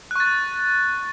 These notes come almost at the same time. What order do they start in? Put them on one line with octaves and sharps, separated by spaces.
F#6 C#6 A6